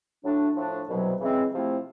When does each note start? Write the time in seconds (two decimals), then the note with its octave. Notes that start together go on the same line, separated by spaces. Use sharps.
0.24 A2 F#3 A3 D4
0.55 A2 F3 A3 D4
0.88 C2 B2 F#3
1.20 C#3 E3 G#3 C4 E4
1.51 C3 F3 A3 C4 E4